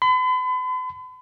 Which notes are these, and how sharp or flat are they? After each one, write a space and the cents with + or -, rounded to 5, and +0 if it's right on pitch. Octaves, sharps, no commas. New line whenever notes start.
B5 +45